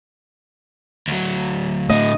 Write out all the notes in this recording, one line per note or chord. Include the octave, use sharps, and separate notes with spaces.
D2 F#3
A2 D3 A3 D#5